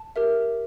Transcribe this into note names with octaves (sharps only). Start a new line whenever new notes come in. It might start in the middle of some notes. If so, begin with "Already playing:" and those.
Already playing: A5
G4 A#4 E5